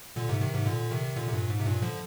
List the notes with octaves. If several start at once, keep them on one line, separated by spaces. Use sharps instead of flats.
A#2 D3
G#2 C3
C3 D#3
G#2 C3
A#2 D3
C3 D#3
A#2 D3
C3
G2 A#2
G#2
C3
G2 A#2
D3 F3